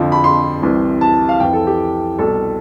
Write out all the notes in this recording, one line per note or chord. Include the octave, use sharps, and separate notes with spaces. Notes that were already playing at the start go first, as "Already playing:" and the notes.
Already playing: F2 D3 F3
B5
C6
C2 C3 E3
A5
F5
F2 E3 G5
A4
G4
C2 B2 A4